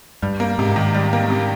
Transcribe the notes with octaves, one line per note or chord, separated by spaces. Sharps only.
G2 G3
A#3
G#2 C3
D#3
G3
A#3
C3